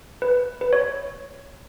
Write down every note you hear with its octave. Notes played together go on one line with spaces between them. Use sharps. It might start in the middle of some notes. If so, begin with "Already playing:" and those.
B4
B4
C#5